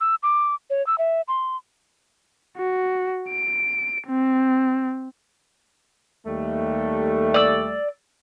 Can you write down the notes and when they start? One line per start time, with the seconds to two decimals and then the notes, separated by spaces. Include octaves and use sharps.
0.01 E6
0.23 D6
0.70 C#5
0.87 E6
0.98 E5
1.28 C6
2.58 F#4
3.30 D7
4.07 C4
6.26 D#2 G3 A3
7.34 D5 E6